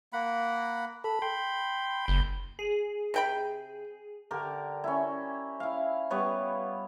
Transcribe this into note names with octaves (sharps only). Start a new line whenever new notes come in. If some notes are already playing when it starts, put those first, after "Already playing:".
A#3 F#5 B5
A4 B5
G5 C6
F#1 G6
G#4
C3 G5 B5
D3 G4 A#4
C#4 E4
E4 F5
G3 B3 B4 C#5